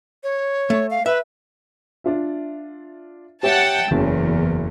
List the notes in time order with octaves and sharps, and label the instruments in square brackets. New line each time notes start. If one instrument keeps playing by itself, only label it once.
[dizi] C#5
[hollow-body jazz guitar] A3
[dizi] F5
[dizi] B4 [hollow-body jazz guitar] E5
[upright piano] D4 F4 E5
[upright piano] G4 C#5 E5 [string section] F#5 G5 A5
[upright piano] F#1 C#4 [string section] E2